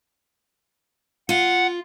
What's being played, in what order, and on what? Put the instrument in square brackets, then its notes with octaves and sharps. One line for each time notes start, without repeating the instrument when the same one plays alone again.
[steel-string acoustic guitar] F4 [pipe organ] F#5